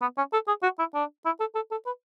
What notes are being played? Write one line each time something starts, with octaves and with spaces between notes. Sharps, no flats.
B3
C#4
A4
G#4
F#4
E4
D4
E4
A4
A4
A4
B4